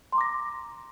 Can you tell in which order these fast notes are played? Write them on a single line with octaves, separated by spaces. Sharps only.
C6 A#5 D6 A#6